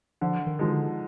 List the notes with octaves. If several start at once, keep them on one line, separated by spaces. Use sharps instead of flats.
D3 F3
D#3
D#3 F3 G#3 D#4
D3